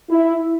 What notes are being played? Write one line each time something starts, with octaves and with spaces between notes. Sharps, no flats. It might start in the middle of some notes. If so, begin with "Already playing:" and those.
E4